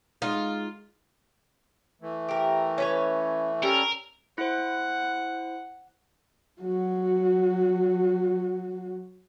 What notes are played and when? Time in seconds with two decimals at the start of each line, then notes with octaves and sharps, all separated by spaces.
0.22 G#3 D#4 F4
2.02 E3 A3
2.29 G4 A#4
2.78 C#4 B4 C#5
3.63 G3 C#4 A4 A#4
4.38 E4 C5 F#5
6.61 F#3 F#4